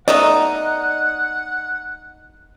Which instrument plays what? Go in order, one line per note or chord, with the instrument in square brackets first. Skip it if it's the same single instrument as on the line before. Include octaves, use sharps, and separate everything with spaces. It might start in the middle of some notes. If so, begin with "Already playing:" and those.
[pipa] B2 A3 D#4 [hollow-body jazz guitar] D5 D#5 [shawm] F#5